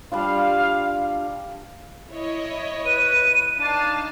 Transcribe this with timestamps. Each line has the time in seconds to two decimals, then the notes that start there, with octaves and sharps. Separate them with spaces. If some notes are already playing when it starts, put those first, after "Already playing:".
0.12 G3 D4 F4 F5
2.12 E4 C#5 D#5
2.85 B4 D#7
3.60 D4 D#4 F5 A5